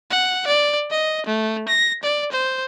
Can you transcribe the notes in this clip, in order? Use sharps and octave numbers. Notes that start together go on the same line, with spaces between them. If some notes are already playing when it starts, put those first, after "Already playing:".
F#5
D5
D#5
A3
A#6
D5
C5